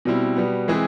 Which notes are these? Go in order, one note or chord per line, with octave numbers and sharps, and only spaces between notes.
B2 G3 C4 E4
B2 G3 B3
E3 G#3 C4 E4 G#4